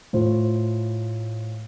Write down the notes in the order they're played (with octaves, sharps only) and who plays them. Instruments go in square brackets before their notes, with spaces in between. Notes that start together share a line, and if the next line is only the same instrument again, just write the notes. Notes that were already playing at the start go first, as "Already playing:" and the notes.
[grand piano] A2 A3 F4 C5